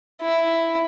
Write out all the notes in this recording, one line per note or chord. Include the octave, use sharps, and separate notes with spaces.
E4